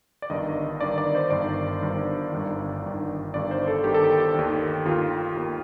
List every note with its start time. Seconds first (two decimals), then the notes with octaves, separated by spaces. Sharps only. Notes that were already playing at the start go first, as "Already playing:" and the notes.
0.22 D5
0.30 G1 G2 D#3 D#5
0.81 G1 G2 D#3 D5
0.98 D5
1.15 C5
1.31 G1 G2 D#3 D5
1.82 G1 G2 D#3
2.33 G1 G2 D#3
2.83 G1 G2 D#3
3.34 G1 G2 D#3 D5
3.51 C5
3.68 A4
3.84 G1 G2 D#3 G4
3.94 A4
4.04 G4
4.35 D#2 D#3
4.85 D#2 D#3 F4
5.36 D#2 D#3